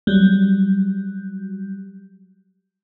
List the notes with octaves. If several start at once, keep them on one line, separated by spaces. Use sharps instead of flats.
F#3 G3